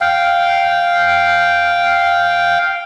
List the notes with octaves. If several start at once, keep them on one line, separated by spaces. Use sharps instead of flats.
F5 G5